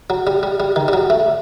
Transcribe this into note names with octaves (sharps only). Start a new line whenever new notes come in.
F#3
G3
G3
G3
D#3
G3
F#3
A3